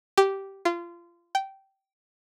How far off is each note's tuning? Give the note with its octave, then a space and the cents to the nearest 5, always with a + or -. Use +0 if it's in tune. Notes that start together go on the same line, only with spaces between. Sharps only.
G4 -10
F4 -25
G5 -15